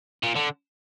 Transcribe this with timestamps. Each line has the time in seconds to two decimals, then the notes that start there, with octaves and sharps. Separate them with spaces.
0.23 A#2
0.36 D3